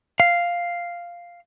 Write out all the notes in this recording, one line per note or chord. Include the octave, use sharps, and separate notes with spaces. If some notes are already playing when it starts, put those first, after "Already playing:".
F5